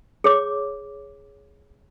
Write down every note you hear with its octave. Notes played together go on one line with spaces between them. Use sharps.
G#4 C#5 D6